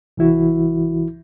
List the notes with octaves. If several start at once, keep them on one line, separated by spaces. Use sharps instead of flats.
C2 E3 E4 F#4